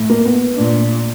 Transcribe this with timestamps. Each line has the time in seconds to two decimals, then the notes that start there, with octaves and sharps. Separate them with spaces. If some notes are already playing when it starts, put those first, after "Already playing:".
Already playing: A2
0.10 A#3
0.26 B3
0.56 A#2 D4